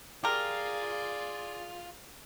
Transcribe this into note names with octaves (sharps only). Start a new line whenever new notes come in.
F4 G4 G#4 A#4 D5